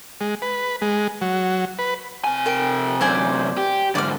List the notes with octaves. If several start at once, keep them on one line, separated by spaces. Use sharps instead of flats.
G#3
B4
G#3
F#3
B4
C3 G#5
A#4 G5
F#2 C3 C5 D5 G#5
G4
G#2 D3 D5 D6 F6